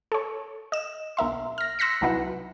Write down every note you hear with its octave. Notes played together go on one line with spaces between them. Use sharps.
A4 C#5
D#5 E7
B1 A#4 E5 C6
F6 A#6
C6 E6 F#6 A#6 B6 C#7
C2 F#3 D#4 E4 B4 F#5